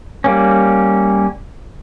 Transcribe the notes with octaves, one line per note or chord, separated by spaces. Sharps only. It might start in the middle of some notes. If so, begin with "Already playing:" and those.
G3 A#3 C#4